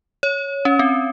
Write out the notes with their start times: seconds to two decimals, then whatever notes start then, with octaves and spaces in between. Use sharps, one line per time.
0.23 C#5
0.65 C#4
0.79 C4